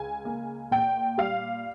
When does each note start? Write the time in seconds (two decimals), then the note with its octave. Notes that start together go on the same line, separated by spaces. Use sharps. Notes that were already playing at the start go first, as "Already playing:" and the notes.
Already playing: C#2 G#5
0.25 A#3
0.71 A#2 G5
1.18 G3 F5